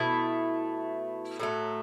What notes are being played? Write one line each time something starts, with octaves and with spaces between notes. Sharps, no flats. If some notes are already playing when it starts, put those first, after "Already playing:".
Already playing: B2 A3 E4
A2 F#3 A3